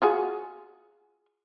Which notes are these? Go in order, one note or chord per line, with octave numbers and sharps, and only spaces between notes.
F4 F#4 G#4